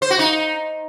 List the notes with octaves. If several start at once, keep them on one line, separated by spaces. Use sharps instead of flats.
C5
F#4
D#4